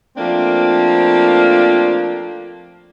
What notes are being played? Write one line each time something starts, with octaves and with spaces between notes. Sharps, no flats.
F3 A3 A#3 C4 D4